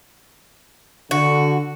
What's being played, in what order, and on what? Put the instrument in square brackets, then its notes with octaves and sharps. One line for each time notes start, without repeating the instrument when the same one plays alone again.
[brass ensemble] D3 [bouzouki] F#4